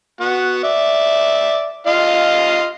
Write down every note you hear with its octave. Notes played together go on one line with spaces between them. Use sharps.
B3 F#4
D5 E5
F4 D#5 F5